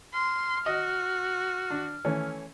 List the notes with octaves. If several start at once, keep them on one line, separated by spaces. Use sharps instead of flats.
C6 F6
F#4 D#5
D4
E3 A3 C#4